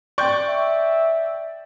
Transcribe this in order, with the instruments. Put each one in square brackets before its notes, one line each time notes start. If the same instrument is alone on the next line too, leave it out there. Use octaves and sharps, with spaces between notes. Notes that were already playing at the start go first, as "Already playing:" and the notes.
[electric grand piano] D5 G5 [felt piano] C#6 G6
[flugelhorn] E5